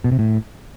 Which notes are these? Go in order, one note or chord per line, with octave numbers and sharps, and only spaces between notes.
B2
C3
A2